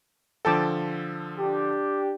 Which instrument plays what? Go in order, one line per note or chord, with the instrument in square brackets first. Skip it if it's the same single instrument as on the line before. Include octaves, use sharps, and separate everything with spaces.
[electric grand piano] D3 F3 A4 [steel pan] G5 A5 D6
[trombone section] D4 G4